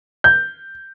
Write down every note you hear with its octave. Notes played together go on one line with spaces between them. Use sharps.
G6